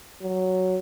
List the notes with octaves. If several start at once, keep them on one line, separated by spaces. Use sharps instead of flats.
F#3